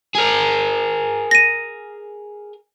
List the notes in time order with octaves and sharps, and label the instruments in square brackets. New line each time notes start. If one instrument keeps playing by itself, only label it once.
[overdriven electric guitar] G#4 A#4
[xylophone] A#6 D#7